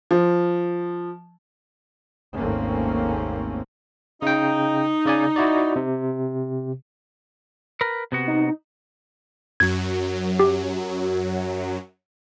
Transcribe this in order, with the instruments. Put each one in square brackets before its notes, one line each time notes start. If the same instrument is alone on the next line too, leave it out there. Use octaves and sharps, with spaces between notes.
[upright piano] F3
[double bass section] G#1 D#2 A3 A#3 C4 C#4
[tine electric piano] C#3 G5 [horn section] D#4
[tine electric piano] C#3 D5 G#5
E4 F#4 D5
C3
[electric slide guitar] A#4 B4
C3 B3 F#4
[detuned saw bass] D#4
[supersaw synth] F#2 F#3 [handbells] G#6
[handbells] G4